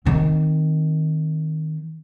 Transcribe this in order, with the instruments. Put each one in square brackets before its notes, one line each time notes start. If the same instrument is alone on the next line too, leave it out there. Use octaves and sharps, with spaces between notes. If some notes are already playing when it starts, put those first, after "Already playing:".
[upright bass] D#3 C4